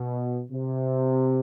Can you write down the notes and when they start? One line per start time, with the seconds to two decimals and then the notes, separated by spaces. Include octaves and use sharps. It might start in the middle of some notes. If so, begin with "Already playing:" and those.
Already playing: B2
0.51 C3